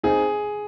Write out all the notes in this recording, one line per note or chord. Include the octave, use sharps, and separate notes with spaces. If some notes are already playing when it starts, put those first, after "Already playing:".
C4 D#4 G#4